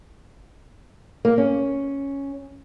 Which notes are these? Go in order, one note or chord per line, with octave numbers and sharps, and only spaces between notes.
A#3
C#4